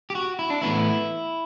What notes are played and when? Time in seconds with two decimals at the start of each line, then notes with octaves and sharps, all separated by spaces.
0.10 G4
0.15 F#4
0.39 E4
0.50 D4
0.62 A2 E3 B3 E4